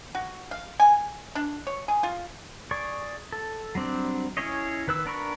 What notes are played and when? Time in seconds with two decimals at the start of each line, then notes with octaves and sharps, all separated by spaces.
0.15 F#4
0.51 F5
0.80 G#5
1.35 D4
1.67 C#5
1.88 G#4
2.03 F4
2.71 G#4 D5 C#6
3.32 A4
3.75 F#3 G3 C4 D4
4.37 C#4 E4 G#4 C#5 D#5
4.87 D#3 B4 E6
5.05 B3 D4 A#4 B5 C#6